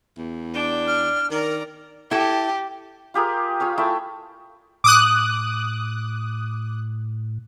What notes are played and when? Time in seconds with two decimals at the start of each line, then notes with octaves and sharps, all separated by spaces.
0.18 E2
0.54 D4 G5
0.87 F6
1.30 D#3 A#4 D5 A#5
2.11 E4 G4 A4
3.14 F4 G4 G#4 A#4
3.60 F4 G#4 C#5 F5
3.78 A3 E4 E5 G5
4.84 A2 D6 D#6 F#6